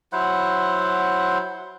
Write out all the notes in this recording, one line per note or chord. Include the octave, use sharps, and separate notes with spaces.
F#3 E4 C5 F#5